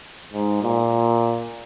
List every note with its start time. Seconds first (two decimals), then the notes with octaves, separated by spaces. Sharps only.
0.33 G#2
0.63 A#2